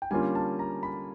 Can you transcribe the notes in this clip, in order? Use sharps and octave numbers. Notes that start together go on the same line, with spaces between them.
G5
D3 G3 A#3 C#4 F4 G#5
A5
A#5
B5